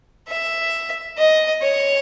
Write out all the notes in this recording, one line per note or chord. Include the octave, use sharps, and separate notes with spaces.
E5
D#5
C#5